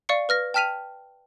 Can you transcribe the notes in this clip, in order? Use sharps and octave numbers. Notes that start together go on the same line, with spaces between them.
D5 F5 C#6 C#7
B4 F6 A#6
G5 A5 F6 B6 D#7 F7